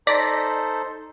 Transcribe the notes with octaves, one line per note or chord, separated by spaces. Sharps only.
D#4 A4 C5 D5 A#6 B6